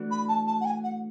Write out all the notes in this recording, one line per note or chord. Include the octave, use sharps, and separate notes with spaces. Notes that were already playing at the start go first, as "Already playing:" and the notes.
Already playing: E3 A3 D4 F#4
B5
A5
A5
F#5
G#5
F#5